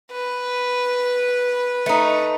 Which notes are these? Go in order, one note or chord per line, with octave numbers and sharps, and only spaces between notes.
B4
A3 D#4